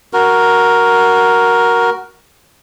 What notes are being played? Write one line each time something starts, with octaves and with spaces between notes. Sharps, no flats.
F#4 A#4